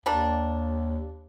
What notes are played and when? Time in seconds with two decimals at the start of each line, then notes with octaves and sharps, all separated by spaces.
0.06 D#2 G3 A#3 D4